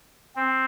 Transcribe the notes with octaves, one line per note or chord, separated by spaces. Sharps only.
C4